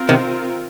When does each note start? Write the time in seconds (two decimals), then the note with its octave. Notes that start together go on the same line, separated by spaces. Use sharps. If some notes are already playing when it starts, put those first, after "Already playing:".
Already playing: C4 F4 A#4
0.09 C3 D#3